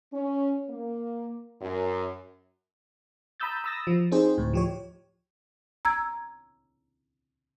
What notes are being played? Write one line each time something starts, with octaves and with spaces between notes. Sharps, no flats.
C#4
A#3
F#2
A#5 B5 D#6 E6 G6 A6
B5 D#6 E6 A6 A#6
F3
C4 D#4 G4 G#4 C5
D2 A2
F3 G4 C#5
A#5 E6 G#6